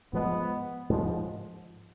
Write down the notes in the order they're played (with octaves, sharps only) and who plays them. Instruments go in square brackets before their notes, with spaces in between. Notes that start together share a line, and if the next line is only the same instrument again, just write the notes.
[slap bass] G#2 F3 G#3 [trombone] B3
[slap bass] G#2 F3 G#3